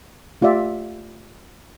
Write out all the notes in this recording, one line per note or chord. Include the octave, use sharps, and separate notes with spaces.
A3 F4 G4 D5 E5